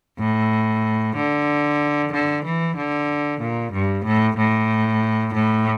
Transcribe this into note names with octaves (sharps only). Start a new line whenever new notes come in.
A2
D3
D3
E3
D3
A#2
G2
A2
A2
A2